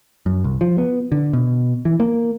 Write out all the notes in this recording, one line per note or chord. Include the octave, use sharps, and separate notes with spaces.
F#2
C2
F3
B3
D3
B2
E3
A#3